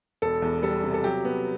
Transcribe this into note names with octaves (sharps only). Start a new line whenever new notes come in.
E1 A4
E2
G3 A4
C3
A4
F#3 G4
B3